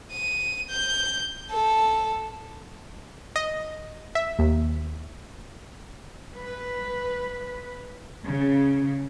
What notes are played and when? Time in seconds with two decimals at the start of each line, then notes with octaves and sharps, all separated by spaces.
0.12 D#7
0.70 G6
1.51 A4
3.36 D#5
4.15 E5
4.39 D#2
6.37 B4
8.25 C#3